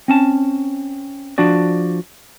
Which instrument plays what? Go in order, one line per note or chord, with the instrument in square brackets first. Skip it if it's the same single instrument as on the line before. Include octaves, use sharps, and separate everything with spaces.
[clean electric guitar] C4 C#4 A5
F3 D4 F#4 D5